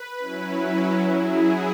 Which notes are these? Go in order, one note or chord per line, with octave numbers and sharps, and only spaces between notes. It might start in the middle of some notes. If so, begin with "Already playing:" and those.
Already playing: B4
F#3 C#4 E4
F#3 E4 G#4